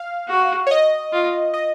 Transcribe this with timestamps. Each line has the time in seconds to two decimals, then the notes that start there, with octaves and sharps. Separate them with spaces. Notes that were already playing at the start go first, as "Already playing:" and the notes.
Already playing: F5
0.28 F#4
0.67 C#5
0.71 D#5
1.12 F4
1.54 D#5